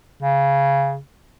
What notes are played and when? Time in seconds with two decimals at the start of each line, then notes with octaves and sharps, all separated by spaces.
0.22 C#3